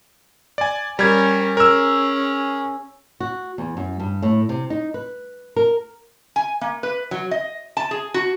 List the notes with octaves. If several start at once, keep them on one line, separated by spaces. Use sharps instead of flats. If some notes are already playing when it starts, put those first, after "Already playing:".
D5 G#5
G3 C#4 A#4 G#6
C#4 G#4 A#4 E6
F#4
E2
F#2
G2
A2
C3
D#4
B4
A#4
G#5
A#3
B4
F#3
D#5
A5
G#4
F#4